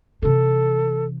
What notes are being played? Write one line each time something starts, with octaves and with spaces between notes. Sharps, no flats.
C3 E3 A4